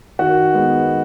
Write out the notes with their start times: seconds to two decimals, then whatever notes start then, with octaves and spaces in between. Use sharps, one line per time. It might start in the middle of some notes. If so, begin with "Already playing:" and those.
0.19 D#3 F#4
0.54 G#3 B3